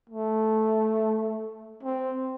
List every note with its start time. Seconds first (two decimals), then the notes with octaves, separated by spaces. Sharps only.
0.10 A3
1.83 C4